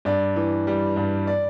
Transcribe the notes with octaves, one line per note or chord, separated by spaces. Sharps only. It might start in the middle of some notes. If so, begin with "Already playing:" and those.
G2 D5
E3
G3
G2
D5